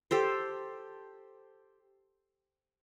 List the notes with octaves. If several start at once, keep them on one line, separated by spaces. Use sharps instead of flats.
G4 A4 C5